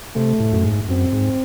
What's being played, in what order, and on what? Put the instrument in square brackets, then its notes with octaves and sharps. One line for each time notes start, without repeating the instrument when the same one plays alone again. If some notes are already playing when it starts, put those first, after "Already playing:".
[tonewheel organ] C3 [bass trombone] A3
[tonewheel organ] A2
F#2
G#2
[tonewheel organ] F#2 [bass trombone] C4
[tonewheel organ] G#2